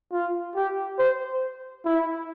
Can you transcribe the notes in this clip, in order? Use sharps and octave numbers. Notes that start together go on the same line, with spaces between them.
F4
G4
C5
E4